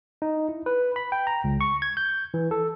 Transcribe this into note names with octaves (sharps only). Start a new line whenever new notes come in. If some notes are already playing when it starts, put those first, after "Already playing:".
D#4
E4
B4
B5
G5
A#5
C#2
C#6
G#6
G6
E3
A4